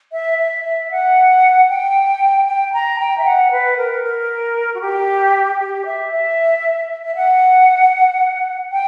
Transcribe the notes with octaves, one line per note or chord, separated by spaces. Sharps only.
E5
E5
E5
F#5
G5
G5
A#5
G5
E5
F#5
B4
A#4
A#4
F#4
G4
G4
E5
E5
E5
F#5
G5